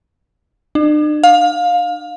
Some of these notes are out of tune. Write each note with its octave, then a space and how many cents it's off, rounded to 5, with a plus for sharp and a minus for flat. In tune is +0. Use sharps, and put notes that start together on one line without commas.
D4 +45
F5 +25